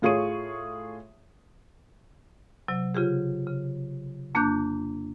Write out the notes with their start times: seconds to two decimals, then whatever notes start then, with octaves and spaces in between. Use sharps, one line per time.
0.02 A2 F4 G#4 C#5 C#6 D#7
2.68 C3 F#3
2.95 C#3 F4 G4 G#4
3.47 C#3
4.35 F2 A#3 D4 D6 F#6 G6